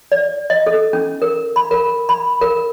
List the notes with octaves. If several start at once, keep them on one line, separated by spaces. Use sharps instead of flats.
D5
D#5
A4
C#4
A#4
B5
A#4
B5
A#4